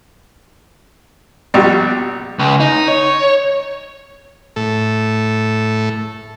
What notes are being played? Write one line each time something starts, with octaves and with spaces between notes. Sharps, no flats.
A#1 B2 G3
C#2
D#4
C#5
A2 A4